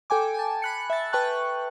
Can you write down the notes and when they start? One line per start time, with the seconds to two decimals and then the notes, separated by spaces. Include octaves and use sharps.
0.10 A4 G5 G#5 D6
0.34 G#5 A5
0.62 B5 F#6 C#7
0.90 E5 A6
1.13 B4 G5 A5 C#6 F#6